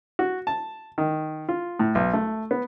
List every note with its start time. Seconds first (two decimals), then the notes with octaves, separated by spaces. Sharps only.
0.19 F#4
0.47 A5
0.98 D#3
1.49 F4
1.79 A2
1.95 B1
2.13 A3
2.51 B3